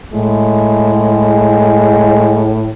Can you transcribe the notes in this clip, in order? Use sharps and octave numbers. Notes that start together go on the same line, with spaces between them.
A2 G#3